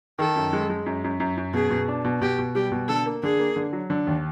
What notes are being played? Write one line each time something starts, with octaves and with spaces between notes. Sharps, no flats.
D#3 A4
F#2
G#3
G#3
F#2
F#2
F#2
F#2
B2 G#4
B2
D4
B2
B2 G4
B2
G3 G4
B2
D3 A4
A#3
D3 G#4
A#3
D3
F#3
D3
D#2